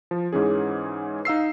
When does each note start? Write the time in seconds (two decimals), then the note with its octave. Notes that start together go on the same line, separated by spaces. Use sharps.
0.11 F3
0.33 G#2 E3 C#4 G#4
1.25 D#4 F5 E6 C7